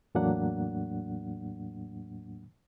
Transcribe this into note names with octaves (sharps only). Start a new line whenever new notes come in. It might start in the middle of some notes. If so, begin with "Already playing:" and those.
E2 A2 F#3 A#3 D4 F#5